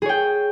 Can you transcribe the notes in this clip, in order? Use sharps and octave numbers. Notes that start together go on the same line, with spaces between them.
G#4 C#5 G5